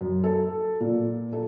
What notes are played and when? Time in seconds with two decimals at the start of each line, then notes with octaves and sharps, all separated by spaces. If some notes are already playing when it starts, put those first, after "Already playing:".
0.01 F#2
0.24 A4
0.80 A#2
1.33 A4